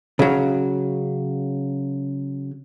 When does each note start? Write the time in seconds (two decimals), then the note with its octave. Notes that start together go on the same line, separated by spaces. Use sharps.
0.19 C#3 F#3